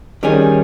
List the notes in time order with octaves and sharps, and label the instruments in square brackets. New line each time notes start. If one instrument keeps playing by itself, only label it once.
[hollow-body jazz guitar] D#3 G3 C#4 G#4